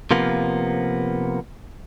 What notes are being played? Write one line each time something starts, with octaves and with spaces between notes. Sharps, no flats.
C3 F3 A#3 B3